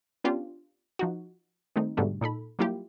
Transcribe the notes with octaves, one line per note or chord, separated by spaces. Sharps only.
B3 C#4 D4 F4 G4
F3 D#4 F#4
D#3 G3 A3 C4 D#4
G#2 B2 D3 G3 A3
A#2 D#4 A4 B5
F#3 G3 A#3 E4 F4 G4